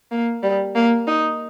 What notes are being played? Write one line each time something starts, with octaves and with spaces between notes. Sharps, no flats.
A#3
G3
A#3
D#4